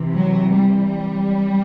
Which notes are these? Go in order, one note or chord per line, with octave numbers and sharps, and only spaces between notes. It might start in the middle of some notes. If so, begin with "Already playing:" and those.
Already playing: C3 E3
F#3
G3